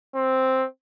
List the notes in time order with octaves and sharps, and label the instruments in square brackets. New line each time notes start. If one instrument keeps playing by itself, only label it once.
[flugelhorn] C4